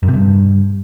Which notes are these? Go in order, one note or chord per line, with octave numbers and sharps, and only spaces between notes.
F#2
C3
G2